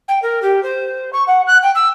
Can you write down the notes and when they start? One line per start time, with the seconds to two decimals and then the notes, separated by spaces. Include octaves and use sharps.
0.08 G5
0.22 A#4
0.42 G4
0.63 C5
1.13 C#6
1.27 F#5
1.47 F#6
1.62 G5
1.75 E6